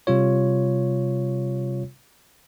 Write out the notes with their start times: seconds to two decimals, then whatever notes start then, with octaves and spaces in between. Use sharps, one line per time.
0.07 C3 G3 F4 C#5